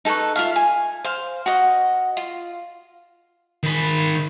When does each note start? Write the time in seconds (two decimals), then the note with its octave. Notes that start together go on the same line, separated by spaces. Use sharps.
0.05 D#4 A4 B4 C#6
0.36 F4 E5 F5
0.56 G#5
1.05 C5 F5
1.46 F#4 D#5
2.17 F4
3.63 D#3 B5